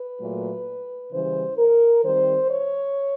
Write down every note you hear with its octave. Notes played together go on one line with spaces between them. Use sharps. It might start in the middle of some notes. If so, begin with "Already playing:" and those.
Already playing: B4
A#2 F#3 A3
C#3 E3 G3 C5
A#4
D#3 G3 C4 C5
C#5